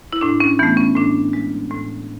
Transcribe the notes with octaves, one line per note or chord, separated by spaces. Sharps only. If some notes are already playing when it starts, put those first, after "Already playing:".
E4
A2 D4
C#4
E3 A3 B3
C#4
A2 D4
G#3
A2